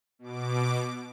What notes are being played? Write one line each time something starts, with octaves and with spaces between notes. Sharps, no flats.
B2 D6